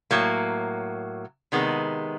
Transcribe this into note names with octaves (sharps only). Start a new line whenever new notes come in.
A2 F#3 A#3
C3 D#3 G#3 B3